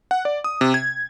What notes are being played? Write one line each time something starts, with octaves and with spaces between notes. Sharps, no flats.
F#5
D5
D#6
C3
G#6